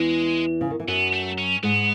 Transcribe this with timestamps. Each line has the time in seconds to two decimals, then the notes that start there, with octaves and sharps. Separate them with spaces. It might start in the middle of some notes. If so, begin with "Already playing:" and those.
Already playing: E2 E3 G#3
0.61 C#3
0.71 D#3
0.80 E3
0.88 F#2 F#3 B3
1.13 A3
1.38 C#4
1.63 G#2 G#3 B3